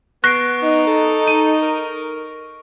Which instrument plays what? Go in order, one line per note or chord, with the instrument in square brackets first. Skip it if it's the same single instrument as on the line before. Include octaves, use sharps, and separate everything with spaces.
[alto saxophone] B3 [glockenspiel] C#6 C7 D7 [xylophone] F#6 A#6
[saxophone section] D#4
[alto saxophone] A4
[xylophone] D#7
[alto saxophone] A#4